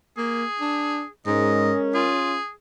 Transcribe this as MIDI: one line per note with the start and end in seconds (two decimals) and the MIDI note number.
0.17 0.45 58
0.17 1.08 68
0.61 1.03 62
1.27 1.72 44
1.27 2.11 56
1.27 2.38 61
1.27 2.11 70
1.27 1.77 75
1.94 2.37 65
1.94 2.51 68